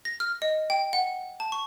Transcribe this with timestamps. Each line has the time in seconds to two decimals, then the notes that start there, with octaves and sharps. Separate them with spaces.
0.05 A#6
0.20 F6
0.42 D#5
0.70 G5
0.93 F#5
1.40 A5
1.52 C#6